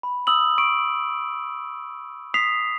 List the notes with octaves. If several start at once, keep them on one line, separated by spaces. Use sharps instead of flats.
B5
D#6 E6 F#7
C#6 D7
D#6 B6 C7 F7